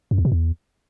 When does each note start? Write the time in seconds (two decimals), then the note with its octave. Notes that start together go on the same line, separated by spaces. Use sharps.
0.11 F#2
0.18 E2
0.25 B2
0.32 E2